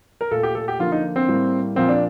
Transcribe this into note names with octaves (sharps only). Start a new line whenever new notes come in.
A#4
A#2 A3 A4
G4
A4
G4
D3 F3 A#3 F4
D#4
C4
A2 G3 A#3
A#2 F3 A#3 C4
D4